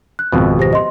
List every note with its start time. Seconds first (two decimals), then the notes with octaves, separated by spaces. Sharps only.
0.19 F#6
0.32 G#1 F2 B2
0.59 G4 C5 A#6
0.73 D#5 C6